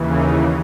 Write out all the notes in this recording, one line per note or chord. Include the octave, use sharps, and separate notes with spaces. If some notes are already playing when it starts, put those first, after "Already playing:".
Already playing: D#2 C#3 E3
D#4